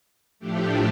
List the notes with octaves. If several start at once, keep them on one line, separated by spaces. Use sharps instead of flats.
A2 F3 A3 D4 G4